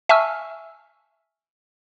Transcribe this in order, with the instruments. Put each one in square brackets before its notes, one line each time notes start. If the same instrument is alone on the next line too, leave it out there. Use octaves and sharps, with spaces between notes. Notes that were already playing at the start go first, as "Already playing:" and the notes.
[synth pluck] E5 G#5 A5 C#6 E6 F6